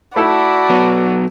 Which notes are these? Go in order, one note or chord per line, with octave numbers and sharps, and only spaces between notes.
A3 E4 F#4 A4 D5 A5 B5
F#3 B3